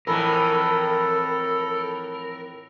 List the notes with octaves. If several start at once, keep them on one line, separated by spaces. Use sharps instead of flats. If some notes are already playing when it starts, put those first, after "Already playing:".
F2 A2 E3 A4 A#4 B5